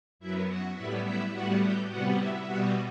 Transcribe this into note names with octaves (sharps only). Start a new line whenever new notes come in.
F#2 F#3 B3 E4 E5
F#4 F#5
A2 G3 B3 E4 E5
E4 E5
A2 G3 B3 F#4 F#5
G4 G5
C3 G3 B3 F#4 F#5
E4 E5
B2 G3 B3 F#4 F#5